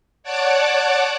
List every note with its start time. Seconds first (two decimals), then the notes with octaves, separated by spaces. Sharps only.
0.23 C#5 D5 F#5 A5 D6